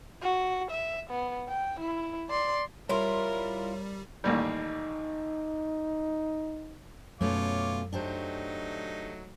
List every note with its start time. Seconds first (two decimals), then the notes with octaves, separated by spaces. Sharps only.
0.22 F#4
0.71 E5
1.10 B3
1.49 G5
1.80 E4
2.29 D5 C6
2.89 G3 E4 F4 A#4 C#5 C6
4.24 A1 D#2 G3 D#4
7.21 F#2 B2 A3 C#4 F4 C#5 D6
7.93 F#3 A3 D4 D#4 G4 C5